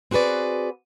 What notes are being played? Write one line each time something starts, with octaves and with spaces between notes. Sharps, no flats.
C4 F#4 G#4 B4 D5